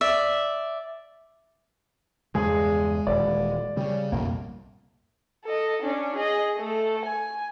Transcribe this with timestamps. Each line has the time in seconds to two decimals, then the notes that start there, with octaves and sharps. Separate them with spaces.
0.01 D5 E5
2.35 E2 G2 C#3 G#3 G#4
3.07 D#1 E3 D5
3.77 C#3 G3
4.12 B1 F2 A2 G3 A#3
5.44 A4 D#5
5.82 C#4 D4
6.16 G#4 D#5
6.57 A3 A4
7.05 G#5